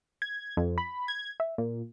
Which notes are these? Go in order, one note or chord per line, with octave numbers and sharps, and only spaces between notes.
G#6
F2
B5
G#6
E5
A#2